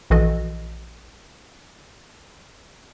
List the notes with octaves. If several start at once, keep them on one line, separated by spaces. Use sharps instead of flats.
A#1 E3 F#4 A4 D#5